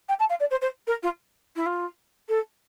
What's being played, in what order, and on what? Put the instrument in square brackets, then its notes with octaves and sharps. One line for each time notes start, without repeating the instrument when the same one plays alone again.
[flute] G5
A5
F5
D5
C5
C5
A#4
F4
E4
F4
A4